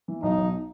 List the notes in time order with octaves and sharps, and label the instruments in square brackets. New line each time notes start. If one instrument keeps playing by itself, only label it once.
[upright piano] E3
[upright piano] B1 [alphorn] D#4
[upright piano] B1